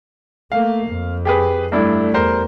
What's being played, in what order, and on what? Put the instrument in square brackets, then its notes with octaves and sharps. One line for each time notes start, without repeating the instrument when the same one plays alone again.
[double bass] A3 A#3 [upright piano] F5
[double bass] F2
[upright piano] G4 G#4 B4
[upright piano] G2 D4 E4 [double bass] A3
[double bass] E2 [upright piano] G3 A#4 C5